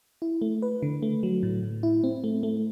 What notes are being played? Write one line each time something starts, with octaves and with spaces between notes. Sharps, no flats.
E4
A3
B4
D3
A3
F#3
A2
A2
E4
C4
A3
A3